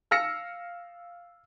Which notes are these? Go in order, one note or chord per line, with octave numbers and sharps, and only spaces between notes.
F5 E6 F6 A#6 C#7